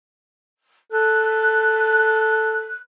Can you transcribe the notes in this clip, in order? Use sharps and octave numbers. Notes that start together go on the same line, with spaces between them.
A4 F#6